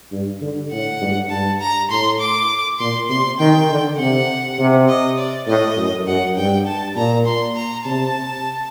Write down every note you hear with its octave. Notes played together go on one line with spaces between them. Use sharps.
G2
D3
A2 F#5
G2
G2 A5
A#5
A2 C6
D6
A#2 C6
C3 C6
D#3 G5
D3
C3 F#5
C3
D#5
D5
A2 D#5
F#2
F#2 F#5
G2 G5
A5
A#2 A#5
C6
A#5
C3 A5